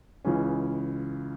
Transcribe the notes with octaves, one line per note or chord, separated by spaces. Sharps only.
C#2 C#3 E3 G#3 C#4